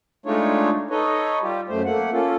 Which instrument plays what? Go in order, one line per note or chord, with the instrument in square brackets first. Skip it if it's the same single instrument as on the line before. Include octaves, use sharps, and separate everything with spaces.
[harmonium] G#3 A3 D4 D#4 F4 C#5
D#4 A4 B4 C#5 D#5
G3 F4 G4
F#2 A3 C5
A3 A#3 F#5
A#3 C#4 F4 A4